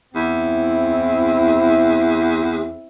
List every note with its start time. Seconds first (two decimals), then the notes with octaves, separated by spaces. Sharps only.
0.15 E2 C4 E4